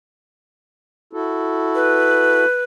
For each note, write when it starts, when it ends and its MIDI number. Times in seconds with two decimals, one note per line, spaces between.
1.13 2.45 64
1.13 2.45 66
1.13 2.45 69
1.75 2.64 71